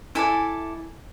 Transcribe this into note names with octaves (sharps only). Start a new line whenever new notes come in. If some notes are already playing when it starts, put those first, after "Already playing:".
E4 A4 D5 G#5